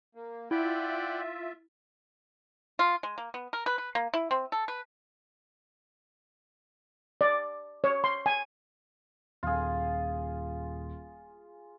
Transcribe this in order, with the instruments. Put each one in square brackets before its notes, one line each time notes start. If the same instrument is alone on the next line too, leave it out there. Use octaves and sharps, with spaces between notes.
[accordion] A#3
[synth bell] E4 [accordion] F4 E5 [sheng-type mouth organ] D5 F#5 G5
[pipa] F4
G#3
A#3
B3
A#4
B4
B4
A#3
E4
C4
A4
B4
[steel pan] D5
C#5
C6
G#5
[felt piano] D#1 [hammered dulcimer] F4 G#4